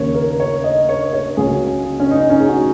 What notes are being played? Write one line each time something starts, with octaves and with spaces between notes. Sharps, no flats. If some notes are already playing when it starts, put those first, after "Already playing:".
Already playing: D#2 C#3 A#3 C#5
A#4
C#5
D#5
C#5
C#5
C#2 C#3 F#3 A#3 G#4
C#4
D#4
C#4
G#4
F#4